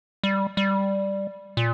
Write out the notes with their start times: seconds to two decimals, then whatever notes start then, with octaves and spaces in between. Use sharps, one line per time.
0.23 G3
0.57 G3
1.57 A#2